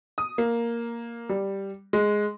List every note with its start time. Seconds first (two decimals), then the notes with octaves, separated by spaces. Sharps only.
0.18 D#6
0.38 A#3
1.29 G3
1.93 G#3